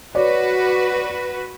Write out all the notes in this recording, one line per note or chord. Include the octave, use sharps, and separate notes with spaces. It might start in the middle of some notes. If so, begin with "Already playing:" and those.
F#4 B4 C#5 D5